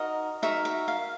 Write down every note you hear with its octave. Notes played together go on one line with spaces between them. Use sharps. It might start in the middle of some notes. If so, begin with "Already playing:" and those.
Already playing: D#4 F#4 A#4 D#5
D#4 F#4 A#4 E5
E5
F5